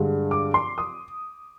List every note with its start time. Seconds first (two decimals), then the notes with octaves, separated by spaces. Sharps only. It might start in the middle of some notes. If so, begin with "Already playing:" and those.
Already playing: G2 D3 G#3
0.31 D6
0.54 C6
0.78 D#6